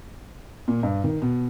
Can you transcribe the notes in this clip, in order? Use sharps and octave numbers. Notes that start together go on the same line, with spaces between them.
A#2
G2
D#3
B2